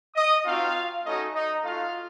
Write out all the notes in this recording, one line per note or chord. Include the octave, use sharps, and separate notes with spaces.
D#5 D#6
C4 D#4 F4 F#4 F5
A3 C#4 D#4 F#4 D#5
D#4 D#5
A3 D#4 F4 F#4 F5